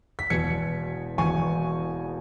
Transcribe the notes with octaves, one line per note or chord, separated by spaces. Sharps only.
B6
E1 E2 B2 G#6 C#7
E1 E2 B2 G#5 C#6